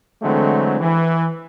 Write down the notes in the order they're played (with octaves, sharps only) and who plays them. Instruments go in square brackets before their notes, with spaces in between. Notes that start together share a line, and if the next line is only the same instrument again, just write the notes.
[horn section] D3 E3 F#3 G#3 A3 C4
E3